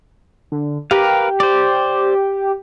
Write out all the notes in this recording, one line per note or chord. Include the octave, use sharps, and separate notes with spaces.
D3
G4 A#4 B4 F5
C5 D5